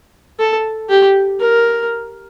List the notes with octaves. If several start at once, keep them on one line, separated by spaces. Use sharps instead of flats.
A4
G4
A#4